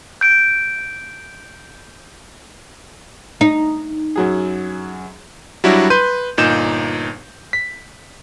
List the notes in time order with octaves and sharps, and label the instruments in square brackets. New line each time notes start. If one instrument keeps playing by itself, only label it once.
[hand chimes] G6 D7
[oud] D#4
[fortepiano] F#2 F#3 G#4
[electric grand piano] F#3 G3 D4 E4 F#4
B4 C6 G6 D#7
G1 A#2 D#4 G6 E7
B6